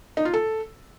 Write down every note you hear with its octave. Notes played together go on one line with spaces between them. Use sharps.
D#4
F4
A4